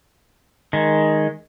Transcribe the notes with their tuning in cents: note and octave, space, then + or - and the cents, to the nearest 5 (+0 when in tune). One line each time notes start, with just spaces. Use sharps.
D#3 +0 G#3 +0